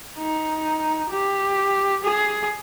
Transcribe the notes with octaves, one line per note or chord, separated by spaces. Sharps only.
D#4
G4
G#4